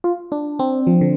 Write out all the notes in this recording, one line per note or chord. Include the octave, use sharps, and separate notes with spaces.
F4
D4
C4
F3
D3